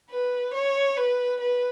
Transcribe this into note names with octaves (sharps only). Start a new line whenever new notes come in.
B4
C#5
B4
B4